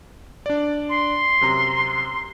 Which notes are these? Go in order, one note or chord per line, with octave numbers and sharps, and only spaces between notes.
D4 D5
C6
F#2 C3 A#5